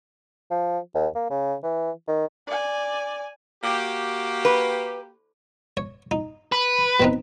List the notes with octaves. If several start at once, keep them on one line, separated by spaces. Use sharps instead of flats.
F3
D#2
A#3
C#3
E3
D#3
D5 G#5
A#3 F#4 G4
B4
C#5
D#4
B4
B2 C4 D#4